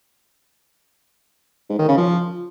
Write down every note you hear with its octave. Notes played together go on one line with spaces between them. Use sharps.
G#2
D#3
C#3
F3